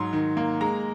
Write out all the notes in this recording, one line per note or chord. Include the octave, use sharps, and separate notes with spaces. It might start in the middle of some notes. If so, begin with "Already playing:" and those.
Already playing: G#2 F#3 C6
D#3
A#3
G#3 A#5